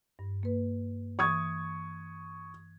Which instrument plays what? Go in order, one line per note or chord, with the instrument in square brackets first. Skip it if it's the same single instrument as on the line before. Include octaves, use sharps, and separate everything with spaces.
[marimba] G2
A#3 B4
[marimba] E3 [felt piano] C#6 D#6 G#6